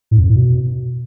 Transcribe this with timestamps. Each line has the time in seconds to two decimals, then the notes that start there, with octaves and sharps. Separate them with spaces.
0.11 A2
0.17 F2
0.24 F#2
0.30 A2
0.36 B2